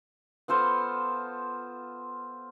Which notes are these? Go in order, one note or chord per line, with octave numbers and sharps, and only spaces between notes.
B3 F4 A4 C5